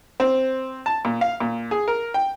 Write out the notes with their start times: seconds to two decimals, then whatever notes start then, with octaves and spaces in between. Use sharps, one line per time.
0.20 C4
0.86 A5
1.05 A#2
1.21 F5
1.40 A#2
1.71 G#4
1.88 A#4
2.14 G5